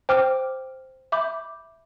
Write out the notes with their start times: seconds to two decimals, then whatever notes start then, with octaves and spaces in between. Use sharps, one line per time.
0.09 C5 G5 D6 F6
1.12 E5 B5 D6 G6